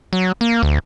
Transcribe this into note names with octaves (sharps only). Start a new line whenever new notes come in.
F#3
A#3
D2